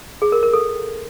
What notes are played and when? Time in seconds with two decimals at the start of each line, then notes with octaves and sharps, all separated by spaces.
0.22 G#4
0.32 A#4
0.43 A#4
0.53 A4